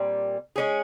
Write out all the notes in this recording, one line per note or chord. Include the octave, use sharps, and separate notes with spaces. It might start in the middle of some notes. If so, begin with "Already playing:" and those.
Already playing: A#2 G3 C4
G#3 C#4 G#4